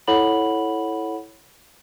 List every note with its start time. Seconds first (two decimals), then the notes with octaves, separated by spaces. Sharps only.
0.08 E4 A4 C#5 F#5 B5 F#7